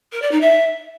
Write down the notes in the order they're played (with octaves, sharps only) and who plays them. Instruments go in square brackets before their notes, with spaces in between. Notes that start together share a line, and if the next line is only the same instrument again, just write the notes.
[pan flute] A#4
D5
D#4
E5